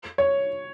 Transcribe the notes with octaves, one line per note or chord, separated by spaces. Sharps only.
C#5